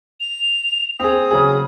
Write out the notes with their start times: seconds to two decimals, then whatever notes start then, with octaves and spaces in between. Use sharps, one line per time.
0.20 F7
1.00 C4 G#4 D#6
1.31 C#3 F#3 G#4